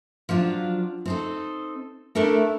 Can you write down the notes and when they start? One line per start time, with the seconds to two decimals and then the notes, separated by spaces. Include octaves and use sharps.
0.29 F3 F#3 D4 F4
1.06 C4 D#4 A4
2.15 A3 D4 E4 A4 A#4